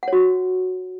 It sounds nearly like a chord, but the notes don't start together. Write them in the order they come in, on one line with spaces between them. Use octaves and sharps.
F#5 C#5 F#4